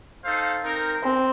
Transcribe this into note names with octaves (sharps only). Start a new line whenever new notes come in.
D#4 A4 C5 F5
C4 D#4 A#4
C4